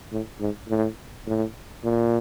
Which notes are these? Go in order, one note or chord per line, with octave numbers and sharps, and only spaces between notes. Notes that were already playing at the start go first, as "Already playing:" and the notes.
A2
G#2
A2
A2
A#2